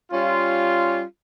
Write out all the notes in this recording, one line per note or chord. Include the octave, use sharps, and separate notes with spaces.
G3 C#4 F4